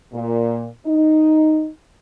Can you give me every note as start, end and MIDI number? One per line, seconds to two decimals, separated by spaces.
0.13 0.67 46
0.86 1.68 63